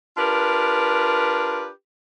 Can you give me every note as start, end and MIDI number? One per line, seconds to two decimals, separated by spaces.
0.18 1.69 62
0.18 1.69 65
0.18 1.69 67
0.18 1.69 70
0.18 1.69 71